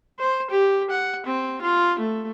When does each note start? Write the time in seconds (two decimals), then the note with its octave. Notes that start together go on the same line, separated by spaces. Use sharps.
0.19 C5
0.50 G4
0.90 F#5
1.26 C4
1.62 F4
1.99 A3